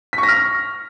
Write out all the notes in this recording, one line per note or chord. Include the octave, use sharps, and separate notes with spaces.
B6
C#6
A#6
F6